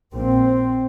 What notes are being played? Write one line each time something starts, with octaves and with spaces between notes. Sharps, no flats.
A#1 A#2 C4